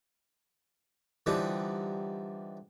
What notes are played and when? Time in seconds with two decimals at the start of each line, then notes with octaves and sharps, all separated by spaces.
1.26 D3 E3 F3 G3 D#4